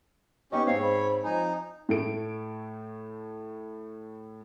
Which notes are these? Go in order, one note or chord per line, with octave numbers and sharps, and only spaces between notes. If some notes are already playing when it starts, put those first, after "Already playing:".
B3 C#4 D#4 G4 D#5 C#6
G#2 C4 C#5 F5
B5
F3 D#4 G#5
A2 A3 D7